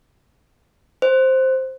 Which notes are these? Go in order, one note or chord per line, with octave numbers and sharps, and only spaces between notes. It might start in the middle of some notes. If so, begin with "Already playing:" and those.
C5